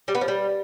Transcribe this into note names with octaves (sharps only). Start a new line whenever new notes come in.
G3
B3
F3
G3